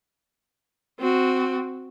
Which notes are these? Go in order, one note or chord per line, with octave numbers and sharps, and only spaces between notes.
C4 F#4